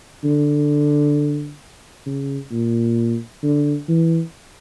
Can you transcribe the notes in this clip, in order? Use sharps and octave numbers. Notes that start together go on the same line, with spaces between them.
D3
C#3
A#2
D3
E3